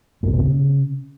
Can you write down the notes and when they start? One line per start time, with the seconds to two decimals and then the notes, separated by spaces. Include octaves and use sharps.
0.23 A2
0.28 C3
0.33 A#2
0.39 C3
0.44 C#3